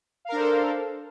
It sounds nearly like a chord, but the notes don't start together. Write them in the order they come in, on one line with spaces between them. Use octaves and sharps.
F5 A#4 D4 C5 A4